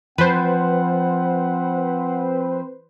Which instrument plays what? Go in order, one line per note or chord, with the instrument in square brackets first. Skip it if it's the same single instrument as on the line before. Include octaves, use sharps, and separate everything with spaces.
[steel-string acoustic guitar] F3 [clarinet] C4 [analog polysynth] B4 C5 [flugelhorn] F#5